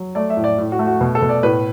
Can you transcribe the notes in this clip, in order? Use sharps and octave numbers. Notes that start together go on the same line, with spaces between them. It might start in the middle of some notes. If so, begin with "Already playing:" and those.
Already playing: F#3
A3 D5
E5
A2
D5
A2
F#4
A3
F#4
B2
A4
B2
D5
A2 B4